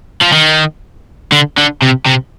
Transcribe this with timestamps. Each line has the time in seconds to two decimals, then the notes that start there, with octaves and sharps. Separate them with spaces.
0.22 F3
0.33 D#3
1.32 D3
1.58 D3
1.82 C3
2.06 C3